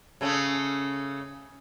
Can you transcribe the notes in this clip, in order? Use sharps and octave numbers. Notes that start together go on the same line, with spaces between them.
C#3 A3 C#4